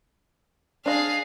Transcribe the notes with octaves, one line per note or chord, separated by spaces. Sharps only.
D4 G#4 D#5 F5